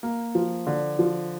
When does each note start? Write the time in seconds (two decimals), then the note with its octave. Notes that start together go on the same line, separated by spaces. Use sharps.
0.03 A#3
0.35 F3
0.67 D3
0.99 F3